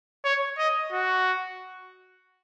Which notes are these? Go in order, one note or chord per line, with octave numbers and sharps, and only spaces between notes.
C#5
D#5
F#4